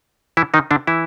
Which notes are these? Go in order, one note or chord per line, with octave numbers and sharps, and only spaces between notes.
E3 E4
D#3 D#4
D3 D4
E3 E4